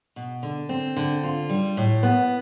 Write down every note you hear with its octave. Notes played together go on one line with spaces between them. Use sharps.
B2
D3
C4
D3
F4
G3
A2
B3